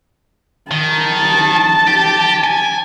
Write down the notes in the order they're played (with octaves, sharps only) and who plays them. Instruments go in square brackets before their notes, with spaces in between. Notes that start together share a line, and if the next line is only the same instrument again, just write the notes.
[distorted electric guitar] D#3 [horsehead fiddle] A5
[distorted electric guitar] G4
G#5